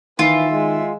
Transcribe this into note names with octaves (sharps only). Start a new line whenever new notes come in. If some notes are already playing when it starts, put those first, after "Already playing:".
D#3 E3 F4 E5
G#3